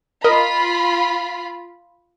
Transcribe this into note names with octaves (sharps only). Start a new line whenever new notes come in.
F4 A#4 D#5 B5